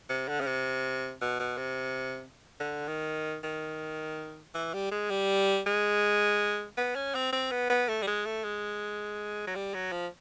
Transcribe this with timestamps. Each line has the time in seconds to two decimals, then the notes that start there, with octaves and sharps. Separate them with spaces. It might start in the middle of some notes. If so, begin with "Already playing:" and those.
0.09 C3
0.28 D3
0.40 C#3
0.46 C3
1.21 B2
1.40 B2
1.57 C3
2.60 D3
2.88 D#3
3.44 D#3
4.55 E3
4.74 G3
4.92 G#3
5.10 G3
5.66 G#3
6.77 B3
6.95 C#4
7.15 C4
7.32 C4
7.51 B3
7.70 B3
7.88 A3
8.02 G3
8.07 G#3
8.26 A3
8.44 G#3
9.47 F#3
9.55 G3
9.74 F#3
9.92 F3